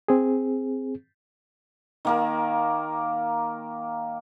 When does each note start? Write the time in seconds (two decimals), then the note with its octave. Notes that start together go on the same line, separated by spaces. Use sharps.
0.08 C4 G#4
2.05 D#3 A#3 A#4